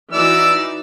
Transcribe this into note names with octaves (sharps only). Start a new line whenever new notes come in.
E3 D#4 F#4 D5 E6